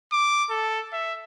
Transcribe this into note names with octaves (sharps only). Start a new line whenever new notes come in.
D6
A4
E5